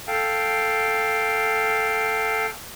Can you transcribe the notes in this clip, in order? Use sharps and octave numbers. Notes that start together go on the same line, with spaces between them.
A4 F5 G5